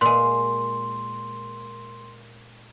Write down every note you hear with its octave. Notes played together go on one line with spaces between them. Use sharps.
A#2 G#3 C6